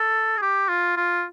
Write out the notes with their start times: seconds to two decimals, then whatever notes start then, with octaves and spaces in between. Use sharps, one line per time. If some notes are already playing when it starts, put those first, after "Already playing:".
Already playing: A4
0.37 G#4
0.42 G4
0.69 F4
0.96 F4